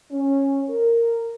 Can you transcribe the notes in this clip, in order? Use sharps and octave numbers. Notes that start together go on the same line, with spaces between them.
C#4
A#4